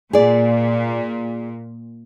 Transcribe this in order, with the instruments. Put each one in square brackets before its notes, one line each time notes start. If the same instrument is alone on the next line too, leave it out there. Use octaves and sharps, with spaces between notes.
[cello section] A#2 [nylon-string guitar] G#4 D5